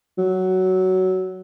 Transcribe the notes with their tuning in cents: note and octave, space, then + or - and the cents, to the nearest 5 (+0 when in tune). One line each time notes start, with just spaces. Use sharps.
F#3 +10